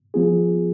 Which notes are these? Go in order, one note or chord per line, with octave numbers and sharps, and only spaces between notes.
F3 B3 F4 G#4